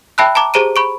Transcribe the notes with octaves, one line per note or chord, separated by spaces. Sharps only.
E5 G5 A5 B5 E6 F#6
A5 A#5 D6
G4 G#4 C5 A#5 D7 D#7
B5 C#6 D7